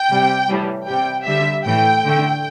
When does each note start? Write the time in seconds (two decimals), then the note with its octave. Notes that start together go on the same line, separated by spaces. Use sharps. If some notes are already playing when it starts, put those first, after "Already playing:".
Already playing: G5
0.10 C3 G3
0.49 A2 E3 G3
0.87 C3 G3 G5
1.26 D3 G3 E5
1.65 A2 E3 A3 G5
2.04 D3 A3